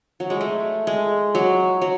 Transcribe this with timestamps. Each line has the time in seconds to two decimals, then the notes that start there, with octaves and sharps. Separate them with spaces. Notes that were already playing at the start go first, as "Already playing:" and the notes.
0.20 F#3
0.30 G#3
0.41 A3
0.87 G#3
1.35 F#3
1.82 F#3